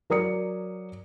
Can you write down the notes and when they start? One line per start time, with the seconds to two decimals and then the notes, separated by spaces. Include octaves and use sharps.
0.10 F#3 A#4 D5 D#6 C#7